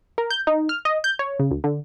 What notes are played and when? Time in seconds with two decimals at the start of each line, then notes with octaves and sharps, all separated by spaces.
0.18 A#4
0.31 G6
0.47 D#4
0.69 F6
0.85 D#5
1.04 G6
1.19 C#5
1.39 C#3
1.51 D2
1.64 D3